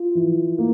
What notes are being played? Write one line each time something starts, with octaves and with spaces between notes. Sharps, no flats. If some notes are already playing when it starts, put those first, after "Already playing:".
Already playing: F4
E3
A#3